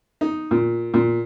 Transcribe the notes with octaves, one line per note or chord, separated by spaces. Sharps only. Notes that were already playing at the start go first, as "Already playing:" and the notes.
D#4
A#2
A#2